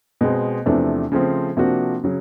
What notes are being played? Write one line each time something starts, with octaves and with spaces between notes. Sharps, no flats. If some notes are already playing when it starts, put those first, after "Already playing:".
B2 G#3 C4
E2 C3 F3 A3 D4
C#3 F3 A3 C4
C3 F3 A#3 D4 F#4
C#3 F#3